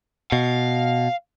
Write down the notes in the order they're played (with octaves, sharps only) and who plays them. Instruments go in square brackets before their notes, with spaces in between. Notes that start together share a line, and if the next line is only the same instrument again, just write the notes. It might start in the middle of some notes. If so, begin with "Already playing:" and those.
[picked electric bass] B2 [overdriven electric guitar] F5